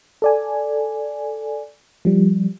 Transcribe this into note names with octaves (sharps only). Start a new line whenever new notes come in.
A4 D5 G#5
F3 G3